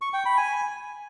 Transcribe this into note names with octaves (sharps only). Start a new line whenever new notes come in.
C#6
G5
B5
G#5